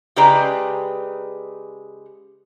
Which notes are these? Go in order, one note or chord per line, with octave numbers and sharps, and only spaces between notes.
C#3 G#3 G4 B4 D5 A#5